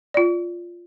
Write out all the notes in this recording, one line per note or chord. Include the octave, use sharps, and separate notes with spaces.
F4 D5